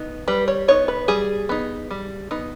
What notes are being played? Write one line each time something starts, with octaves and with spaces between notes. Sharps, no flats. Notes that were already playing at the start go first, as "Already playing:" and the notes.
Already playing: B3 D#4
G3 B4
C#5
B3 D#4 C#5
B4
G3 G#4
B3 D#4
G3
B3 D#4